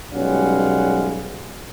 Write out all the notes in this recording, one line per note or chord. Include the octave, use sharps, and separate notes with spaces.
B1 G3 G#3 C#4 F5 F#5